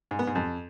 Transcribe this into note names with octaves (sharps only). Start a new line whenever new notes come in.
G#2
B3
G#2
F2